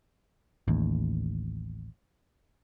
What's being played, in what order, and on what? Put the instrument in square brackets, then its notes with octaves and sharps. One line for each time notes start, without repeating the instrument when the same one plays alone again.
[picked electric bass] A1 D#2